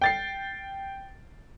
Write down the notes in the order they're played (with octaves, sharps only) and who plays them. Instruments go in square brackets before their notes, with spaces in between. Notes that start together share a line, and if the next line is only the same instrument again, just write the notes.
[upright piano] G5 A6 C7